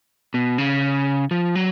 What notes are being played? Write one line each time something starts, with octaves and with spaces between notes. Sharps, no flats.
B2
C#3
F3
F#3